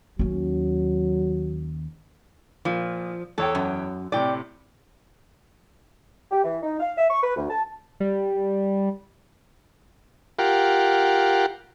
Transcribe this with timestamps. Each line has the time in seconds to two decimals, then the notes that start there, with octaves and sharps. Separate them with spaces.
0.19 D#2 F#3 C#4
2.65 A#2 F3
3.38 E2 A4 C#5 G5
3.55 F#2
4.12 A2 C3 D5 G5
6.31 G4
6.44 E3
6.62 D#4
6.80 F5
6.98 E5
7.10 C#6
7.23 B4
7.36 D2
7.50 A5
8.00 G3
10.39 F4 G4 A#4 F#5